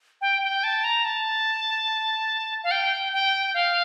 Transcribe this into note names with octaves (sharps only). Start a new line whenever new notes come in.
G5
G5
A5
A#5
A5
F5
G5
G5
F5